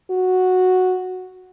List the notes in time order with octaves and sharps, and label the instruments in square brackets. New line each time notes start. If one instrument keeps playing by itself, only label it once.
[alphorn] F#4